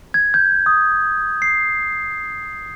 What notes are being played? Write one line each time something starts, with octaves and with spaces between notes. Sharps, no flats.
G#6
G6
D#6
C7